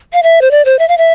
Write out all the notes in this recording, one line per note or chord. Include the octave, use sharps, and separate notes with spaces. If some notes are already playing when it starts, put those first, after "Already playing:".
F5
E5
C5
D5
C5
E5
F5
E5